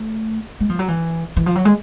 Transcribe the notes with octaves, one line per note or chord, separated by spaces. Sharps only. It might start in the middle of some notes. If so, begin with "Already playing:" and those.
Already playing: A3
G#3
F3
F#3
E3
E3
F3
F#3
G#3